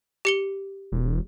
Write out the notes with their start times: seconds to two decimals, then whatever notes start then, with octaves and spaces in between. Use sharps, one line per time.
0.25 G4 C#7 G7
0.92 E1